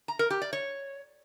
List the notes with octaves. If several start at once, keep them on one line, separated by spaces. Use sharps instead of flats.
A#5
A#4
G4
D5
C#5